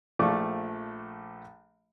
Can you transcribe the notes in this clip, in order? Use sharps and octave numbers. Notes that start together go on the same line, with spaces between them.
A#1 F3 A3 D5 C#6 D6